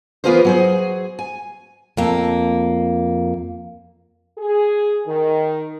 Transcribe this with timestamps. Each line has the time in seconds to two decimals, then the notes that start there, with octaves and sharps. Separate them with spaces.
0.24 E3 B3 F4 G#4 A#4 C5
0.45 F#3 G#4 C5
1.19 G#5
1.97 F2 A#3
4.38 G#4
5.07 D#3